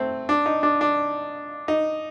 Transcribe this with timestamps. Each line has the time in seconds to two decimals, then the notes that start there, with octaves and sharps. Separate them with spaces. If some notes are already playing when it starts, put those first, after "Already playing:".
Already playing: A3 C4
0.29 D4
0.46 D#4
0.63 D4
0.81 D4
1.68 D#4